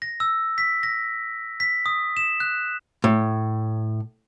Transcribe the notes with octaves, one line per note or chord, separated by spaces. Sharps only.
A#6
E6
B6
A#6
B6
D#6
E7
F#6
A2